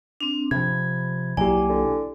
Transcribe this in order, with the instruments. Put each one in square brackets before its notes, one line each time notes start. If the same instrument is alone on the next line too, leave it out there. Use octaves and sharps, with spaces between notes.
[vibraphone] C4 D4
[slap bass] C3 F3 [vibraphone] B5 [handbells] G#6
[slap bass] B1 F#3 A#3 [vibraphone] E4 D5 [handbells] G4 G#5
[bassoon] D3